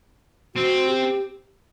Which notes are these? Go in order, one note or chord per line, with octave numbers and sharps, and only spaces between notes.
C4 F#4
G4